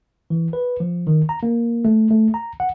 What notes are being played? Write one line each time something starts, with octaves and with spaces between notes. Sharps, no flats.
E3
B4
F3
D#3
A#5
A#3
A3
A3
A#5
F#5